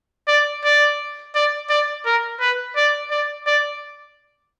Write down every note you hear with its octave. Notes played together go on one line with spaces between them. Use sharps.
D5
D5
D5
D5
A#4
B4
D5
D5
D5